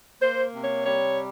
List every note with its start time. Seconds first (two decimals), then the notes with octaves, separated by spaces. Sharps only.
0.21 A#3 C5
0.53 C3
0.63 C#5
0.85 G3 C#5